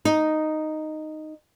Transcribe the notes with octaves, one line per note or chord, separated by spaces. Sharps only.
D#4